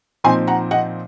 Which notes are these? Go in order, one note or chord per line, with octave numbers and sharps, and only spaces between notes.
A#2 F3 C4 D#4 G#5 C6
F#5 A#5
D#5 F#5